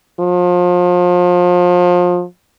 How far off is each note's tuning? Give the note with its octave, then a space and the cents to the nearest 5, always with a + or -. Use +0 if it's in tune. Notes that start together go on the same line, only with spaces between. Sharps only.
F3 +30